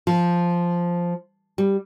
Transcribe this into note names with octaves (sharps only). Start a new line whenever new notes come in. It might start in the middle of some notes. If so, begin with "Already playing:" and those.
F3
G3